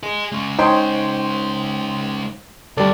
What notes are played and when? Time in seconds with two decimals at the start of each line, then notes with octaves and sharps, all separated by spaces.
0.03 G#4 D#5
0.32 G#3 C#4
0.59 D#4 C5 C#5 G5 C6
2.77 D2 G3 A4 D5